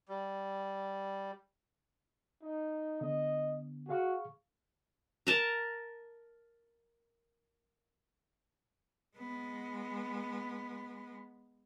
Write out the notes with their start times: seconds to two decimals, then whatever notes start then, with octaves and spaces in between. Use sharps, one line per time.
0.08 G3
2.43 D#4
3.01 D3 B3 D#5
3.89 F#4 G#4 F5 C#6
5.27 A#4 A5 A#5
9.17 G#3 B3